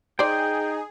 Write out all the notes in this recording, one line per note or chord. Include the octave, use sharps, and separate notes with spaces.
D#4 G#4 C5 D5 G5